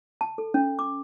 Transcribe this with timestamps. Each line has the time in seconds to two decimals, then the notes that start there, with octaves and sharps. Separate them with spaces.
0.21 A5
0.38 A4
0.54 C#4
0.79 D6